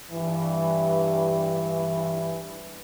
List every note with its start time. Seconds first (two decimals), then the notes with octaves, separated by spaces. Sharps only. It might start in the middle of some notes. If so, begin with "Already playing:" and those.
0.12 G2 E3